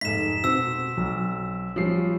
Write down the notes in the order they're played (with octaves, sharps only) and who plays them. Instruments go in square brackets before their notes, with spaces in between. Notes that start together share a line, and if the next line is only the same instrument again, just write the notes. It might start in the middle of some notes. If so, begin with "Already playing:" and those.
[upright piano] F1 G#2 [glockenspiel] B6 E7
[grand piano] B2 [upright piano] C4 [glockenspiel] E6
[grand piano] B1
[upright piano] F3 C7 [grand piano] G3 C#4